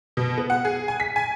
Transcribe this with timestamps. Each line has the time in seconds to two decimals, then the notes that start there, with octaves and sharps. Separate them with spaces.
0.17 B2
0.38 B3
0.50 F#5
0.65 G#4
0.88 G#5
1.00 B6
1.16 G#5